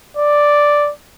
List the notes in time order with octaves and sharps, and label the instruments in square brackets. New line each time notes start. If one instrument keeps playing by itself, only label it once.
[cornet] D5